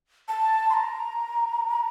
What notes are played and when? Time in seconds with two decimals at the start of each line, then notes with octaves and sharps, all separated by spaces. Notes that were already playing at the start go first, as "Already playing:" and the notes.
0.28 A5
0.70 C6
0.73 A#5